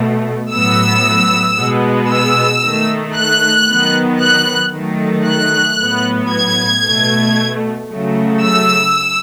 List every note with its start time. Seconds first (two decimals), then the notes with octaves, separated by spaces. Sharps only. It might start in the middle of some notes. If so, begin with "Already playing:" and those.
Already playing: B2 A3
0.53 A2 F#3 B3 E6
1.58 B2 G#3 B3
2.11 E6
2.64 D#3 A3
3.17 F#6
3.69 D#3 F#3 B3
4.22 F#6
4.75 D#3 F#3 A3
5.28 F#6
5.80 A2 F#3 B3
6.33 G#6
6.85 B2 A3
7.91 C#3 F#3 A3
8.43 E6